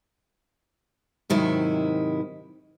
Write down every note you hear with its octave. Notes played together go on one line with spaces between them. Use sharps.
G#2 C3 D#3 F#3 E4